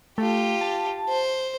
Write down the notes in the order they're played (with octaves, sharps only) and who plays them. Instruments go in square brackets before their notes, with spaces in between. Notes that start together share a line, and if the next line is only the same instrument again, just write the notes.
[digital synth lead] A3 [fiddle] F4 G4
[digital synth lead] A5
[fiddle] C5